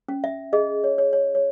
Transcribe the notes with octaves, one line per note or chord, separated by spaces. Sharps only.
C#4
E5
G#4 D#5
C#5
C#5
C#5
C#5